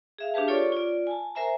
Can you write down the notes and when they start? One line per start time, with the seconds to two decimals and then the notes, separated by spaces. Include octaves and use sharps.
0.18 G#4 E5 F5
0.34 D4 G4 G#4 B4 A5
0.48 F4 A4 C#5 D5 C#6 D6
0.72 F4 D5
1.07 G#5 A5
1.35 A#4 C5 E5 G#5 A#5